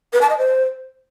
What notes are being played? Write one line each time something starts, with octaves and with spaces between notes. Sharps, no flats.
B4
A5
D#5
C5